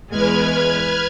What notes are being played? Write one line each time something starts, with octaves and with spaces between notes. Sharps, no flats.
E2 G#3 B4 F6 G#6